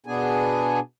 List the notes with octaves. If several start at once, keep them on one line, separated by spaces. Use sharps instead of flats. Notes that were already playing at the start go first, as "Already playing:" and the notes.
B2 B3 D4 G#4 G#5